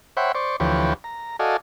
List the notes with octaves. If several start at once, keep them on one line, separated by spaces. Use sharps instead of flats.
C5 C#5 E5 F#5 G5 B5
C5 D5 C#6
D2 E3 F3 G4 B4 C#5
A#5
F#4 A4 D5 D#5 F5 G#5